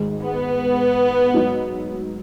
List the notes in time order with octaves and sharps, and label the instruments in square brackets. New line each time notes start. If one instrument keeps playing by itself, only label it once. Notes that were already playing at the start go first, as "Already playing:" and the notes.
Already playing: [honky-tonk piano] G#1 G#2 G#3
[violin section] B3
[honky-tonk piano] G#2 F#3 D#4